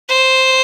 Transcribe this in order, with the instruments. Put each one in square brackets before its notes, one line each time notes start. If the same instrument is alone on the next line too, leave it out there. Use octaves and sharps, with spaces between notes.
[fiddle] C5